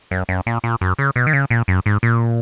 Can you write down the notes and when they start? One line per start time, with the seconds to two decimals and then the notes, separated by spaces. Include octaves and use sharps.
0.11 F#2
0.29 F#2
0.47 A#2
0.64 A#2
0.81 F#2
0.99 C#3
1.16 B2
1.27 D#3
1.33 C#3
1.50 A#2
1.68 F#2
1.86 G#2
2.03 A#2